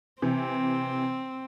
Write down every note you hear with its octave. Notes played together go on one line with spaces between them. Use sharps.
C3 E3 C4